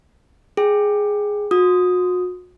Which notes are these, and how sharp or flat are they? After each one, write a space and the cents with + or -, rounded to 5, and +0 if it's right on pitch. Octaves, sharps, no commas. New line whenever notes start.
G#4 +0 G5 +0
F#4 -35 D#6 +0